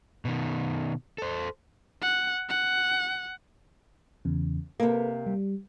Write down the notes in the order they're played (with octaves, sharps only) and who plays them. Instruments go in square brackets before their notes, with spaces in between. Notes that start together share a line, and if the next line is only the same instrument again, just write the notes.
[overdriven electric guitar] B2 D#3
A4 C5
[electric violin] F#5
F#5
[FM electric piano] E2 C#3
[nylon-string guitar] C3 A#3 [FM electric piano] A4 B4
[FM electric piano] G3